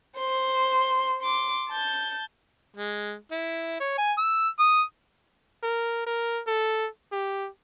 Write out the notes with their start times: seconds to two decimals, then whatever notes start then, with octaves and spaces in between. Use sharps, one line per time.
0.18 C5 C6
1.22 C6 D6
1.69 A5 G6
2.76 G#3
3.31 E4
3.80 C#5
3.98 G#5
4.18 E6
4.59 D#6
5.63 A#4
6.06 A#4
6.47 A4
7.12 G4